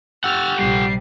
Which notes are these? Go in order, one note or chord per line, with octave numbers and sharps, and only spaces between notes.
G4 F#5 E6 F6 A6
A#1 C3 G3 C7